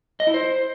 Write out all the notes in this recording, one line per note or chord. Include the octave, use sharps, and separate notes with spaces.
D#5
E4
C5